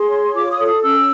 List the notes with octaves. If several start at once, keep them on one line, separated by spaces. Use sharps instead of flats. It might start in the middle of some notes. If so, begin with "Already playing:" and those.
Already playing: G#4 C6
C#5
F4 D6
D#6
A4
D#6
C#4 E6